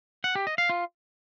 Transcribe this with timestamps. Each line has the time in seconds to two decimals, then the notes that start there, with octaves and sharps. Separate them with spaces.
0.24 F#5
0.35 G4
0.47 D#5
0.58 F5
0.69 F4